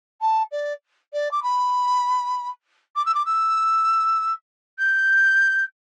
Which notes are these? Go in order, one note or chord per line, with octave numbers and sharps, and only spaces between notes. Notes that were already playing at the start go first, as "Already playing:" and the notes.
A5
D5
D5
D6
B5
D6
E6
D6
E6
G6